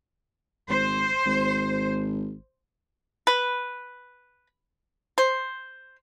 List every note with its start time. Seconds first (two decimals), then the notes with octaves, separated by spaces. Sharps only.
0.69 G#1 C5
1.26 G#1
3.27 B4
5.18 C5